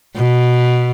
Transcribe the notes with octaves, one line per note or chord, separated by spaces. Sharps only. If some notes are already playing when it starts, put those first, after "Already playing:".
B2